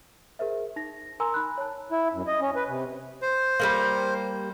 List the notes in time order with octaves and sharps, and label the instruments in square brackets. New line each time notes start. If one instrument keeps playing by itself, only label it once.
[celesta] G#4 A#4 C5 E5
D#4 A#6
A#4 G#5 A#5 C6 E6
D#4 B5 F#6
C#5 A5
[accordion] E4
F#2
D#5
C#4
B4
C3
[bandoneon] C5
[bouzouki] G3 G#3 A#3